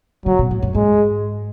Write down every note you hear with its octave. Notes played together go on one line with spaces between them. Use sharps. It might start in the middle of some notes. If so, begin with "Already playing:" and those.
C#3 F#3
B2
A2
F#2
G#2 G#3